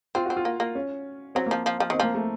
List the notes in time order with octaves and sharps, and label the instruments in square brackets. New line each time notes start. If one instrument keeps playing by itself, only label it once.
[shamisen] C4 [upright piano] F4
[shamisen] C4 [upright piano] F#4
[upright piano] F4
[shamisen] A#3
A#3
[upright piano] C#4
[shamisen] F#3 [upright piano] C4
[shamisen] F3 [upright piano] A#3
[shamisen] F3
F3
[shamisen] D#3 [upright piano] C4
[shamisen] F3 [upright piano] A#3
[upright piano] A3